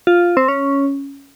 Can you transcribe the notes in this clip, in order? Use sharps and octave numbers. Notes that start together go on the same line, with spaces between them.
F4
C4
C#4